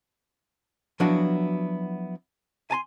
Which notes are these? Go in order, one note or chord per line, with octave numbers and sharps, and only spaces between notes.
F3 F#3 B3 D4 E4 F#4
G#5 A5 C6